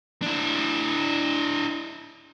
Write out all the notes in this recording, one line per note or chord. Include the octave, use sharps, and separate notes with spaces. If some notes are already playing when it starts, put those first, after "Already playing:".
D4 E4